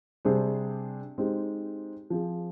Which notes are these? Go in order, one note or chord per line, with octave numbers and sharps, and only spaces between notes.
C3 G3 D4 G#4 C5
G#3 C4 D#4 G4
F3 C4 F4 G#4